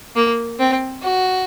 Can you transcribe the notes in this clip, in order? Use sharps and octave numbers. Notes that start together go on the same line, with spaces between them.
A#3
C4
F#4